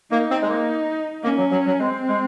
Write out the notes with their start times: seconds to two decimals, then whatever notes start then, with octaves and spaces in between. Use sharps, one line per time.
0.11 A#3 D#4
0.30 C4
0.42 G#3
0.49 A#3
1.23 A#3 C#4
1.38 F#3
1.52 F#3
1.66 F#3
1.80 G#3 C4
2.08 G#3